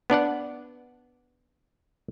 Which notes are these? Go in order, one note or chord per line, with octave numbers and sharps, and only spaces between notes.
B3 D4 D5 F#5